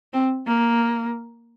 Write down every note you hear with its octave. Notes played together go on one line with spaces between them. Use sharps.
C4
A#3